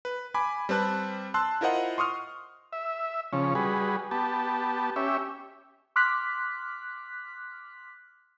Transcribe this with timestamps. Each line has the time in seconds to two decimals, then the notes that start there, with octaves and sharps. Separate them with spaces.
0.05 B4
0.34 G#5 B5 D6
0.69 G3 C4 B4 A5 F#6
1.34 A5 C6 E6 F#6
1.61 E4 F4 A#4 C5 D#5 F#5
1.98 C6 C#6 D#6 F6
2.73 E5
3.33 C#3 F3 C#4
3.55 G3 F#4 G#4 B4
4.11 B3 G4 A5
4.96 C#4 G4 E5
5.96 C6 D6 F6 F#6 B6